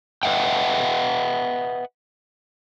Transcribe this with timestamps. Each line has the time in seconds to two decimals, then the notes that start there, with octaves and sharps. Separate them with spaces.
0.23 B4 D#5 E5 F#5 G5